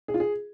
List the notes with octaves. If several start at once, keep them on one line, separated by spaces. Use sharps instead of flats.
G#4
F4
G#4